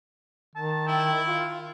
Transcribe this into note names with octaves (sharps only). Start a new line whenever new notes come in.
D#3 A5
E4 G5
F4